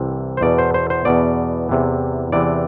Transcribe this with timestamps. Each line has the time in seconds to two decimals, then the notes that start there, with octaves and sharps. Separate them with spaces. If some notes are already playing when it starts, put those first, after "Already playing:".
Already playing: C2 C3 E3
0.37 C5
0.41 E2 B2 D5
0.58 C5
0.74 C5
0.90 C5
1.05 E2 B2 D5
1.69 E2 C3 E3
2.32 E2 C3 E3 D5